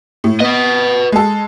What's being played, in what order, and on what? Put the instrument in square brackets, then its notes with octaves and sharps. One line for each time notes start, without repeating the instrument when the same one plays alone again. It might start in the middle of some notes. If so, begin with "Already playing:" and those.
[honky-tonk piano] A2
[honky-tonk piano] B3 [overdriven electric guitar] B4 D#5
[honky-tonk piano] G#3 A4